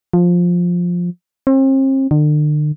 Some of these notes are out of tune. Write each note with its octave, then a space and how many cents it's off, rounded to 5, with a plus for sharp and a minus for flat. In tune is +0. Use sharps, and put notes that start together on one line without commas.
F3 +10
C4 +40
D3 +40